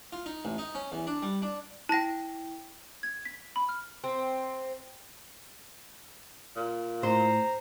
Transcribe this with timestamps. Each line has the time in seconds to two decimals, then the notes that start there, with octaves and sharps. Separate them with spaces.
0.12 F4
0.26 D#4
0.45 A1
0.58 D#4
0.75 C#4
0.92 E2
1.07 D4
1.22 G3
1.42 D4
1.89 E4 G5 A5 A#6
3.03 G#6
3.25 B6
3.56 B5
3.69 F6
4.04 C4
6.56 A#2
7.03 A2 C5 A#5